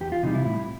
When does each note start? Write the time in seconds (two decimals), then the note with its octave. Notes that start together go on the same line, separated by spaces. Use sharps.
0.01 E2 G4
0.12 F4
0.23 C3 E3 G3 D#4
0.34 E4
0.45 A2 E4